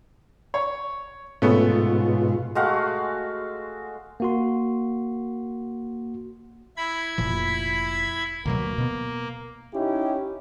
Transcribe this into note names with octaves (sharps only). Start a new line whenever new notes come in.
C#5
G#2 B2 A3 B3 C#4 F4
G#3 A3 F#4 F5
A#3 F#4 C6
E4 B5 G#6
F1 A#2 F3
D2 B2 F#3 A#3
B2 B3
C#4 D#4 E4 G4